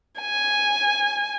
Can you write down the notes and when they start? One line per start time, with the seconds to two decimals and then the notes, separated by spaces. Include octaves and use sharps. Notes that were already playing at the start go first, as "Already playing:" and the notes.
0.21 G#5